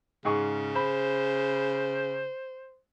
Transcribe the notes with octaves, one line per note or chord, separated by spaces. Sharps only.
G#2 C#3 G#4 C#6
C5 B5